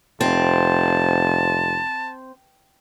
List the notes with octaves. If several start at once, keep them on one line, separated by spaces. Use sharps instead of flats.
F1 C4 A5